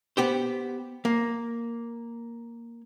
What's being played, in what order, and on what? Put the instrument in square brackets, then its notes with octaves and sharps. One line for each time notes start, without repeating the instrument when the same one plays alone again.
[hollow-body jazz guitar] B3 G4 C5
A#3